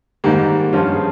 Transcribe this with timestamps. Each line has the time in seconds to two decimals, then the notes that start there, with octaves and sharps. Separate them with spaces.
0.24 G#2 D#3 G3 A#3
0.73 G2 F3 C#4 F4
0.94 G#4